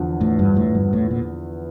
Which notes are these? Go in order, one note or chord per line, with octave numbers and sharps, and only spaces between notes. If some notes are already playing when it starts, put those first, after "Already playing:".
Already playing: E2 D3 F3
A2
G2
A2
G2
A2
A#2